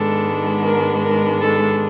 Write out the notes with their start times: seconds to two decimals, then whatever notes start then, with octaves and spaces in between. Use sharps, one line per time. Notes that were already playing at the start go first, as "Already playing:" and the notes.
Already playing: G#2 D#3 G#3 B3 D4 A4
0.63 A#4
1.01 A#4
1.40 A4